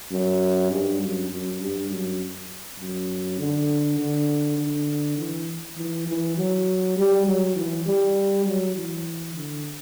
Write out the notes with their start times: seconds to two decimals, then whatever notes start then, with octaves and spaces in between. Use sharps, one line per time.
0.12 F#2
0.71 G2
1.01 F#2
1.30 F#2
1.61 G2
1.90 F#2
2.79 F#2
3.39 D3
3.99 D3
4.59 D3
5.18 E3
5.77 E3
6.07 E3
6.37 F#3
6.97 G3
7.26 F#3
7.56 E3
7.86 G3
8.46 F#3
8.75 E3
9.35 D3